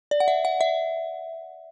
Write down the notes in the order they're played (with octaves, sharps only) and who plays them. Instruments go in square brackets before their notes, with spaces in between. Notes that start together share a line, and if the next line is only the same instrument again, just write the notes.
[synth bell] D5
F#5
E5
F#5
E5